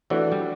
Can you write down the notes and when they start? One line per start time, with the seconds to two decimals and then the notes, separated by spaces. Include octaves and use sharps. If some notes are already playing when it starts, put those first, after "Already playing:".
0.10 E3 A3 D4 F#4
0.32 G3